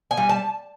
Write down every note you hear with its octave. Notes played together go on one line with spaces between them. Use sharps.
G#5
G3
A5